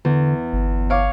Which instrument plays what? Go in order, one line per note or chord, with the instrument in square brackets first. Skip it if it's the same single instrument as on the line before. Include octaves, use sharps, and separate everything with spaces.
[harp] E2 [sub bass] D3
[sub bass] G1
[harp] C#5 F5 D6